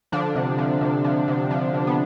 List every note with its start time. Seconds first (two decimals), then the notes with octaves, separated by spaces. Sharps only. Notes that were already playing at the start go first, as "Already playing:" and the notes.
0.12 D3 F3 D4
0.35 C3
0.58 F3
0.81 C3
1.04 F3
1.28 C3
1.51 F3
1.74 C3
1.87 B3